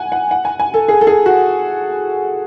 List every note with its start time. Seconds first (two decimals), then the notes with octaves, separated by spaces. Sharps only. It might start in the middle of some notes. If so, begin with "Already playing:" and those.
Already playing: F#5 G#5
0.12 F#5
0.31 F#5
0.45 G#5
0.60 G#5
0.74 A4
0.88 G#4
1.01 A4
1.07 G#4
1.26 F#4